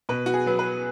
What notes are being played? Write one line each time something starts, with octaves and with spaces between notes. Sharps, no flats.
B2 B4
F#4
G#4
F#3 B3
B4